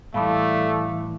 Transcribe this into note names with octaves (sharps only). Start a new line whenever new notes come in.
A2 E3 G3 A3 F5 B5 D6